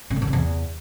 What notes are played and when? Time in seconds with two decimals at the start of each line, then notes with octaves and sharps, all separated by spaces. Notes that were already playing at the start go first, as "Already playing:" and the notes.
0.10 C3
0.16 A#2
0.22 D3
0.27 C3
0.33 E2